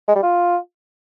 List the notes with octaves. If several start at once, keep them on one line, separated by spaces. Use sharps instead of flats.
G#3
G3
F4